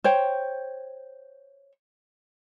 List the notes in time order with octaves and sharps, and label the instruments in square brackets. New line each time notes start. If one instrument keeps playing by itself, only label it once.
[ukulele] C5 C#5 G5